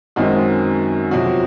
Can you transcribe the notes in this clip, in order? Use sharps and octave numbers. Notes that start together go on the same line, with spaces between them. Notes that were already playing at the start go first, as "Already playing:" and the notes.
F#2 D#3 G#3 C4 F#4
F2 C3 F#3 F#4